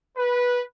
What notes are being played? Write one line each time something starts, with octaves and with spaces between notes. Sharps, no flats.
B4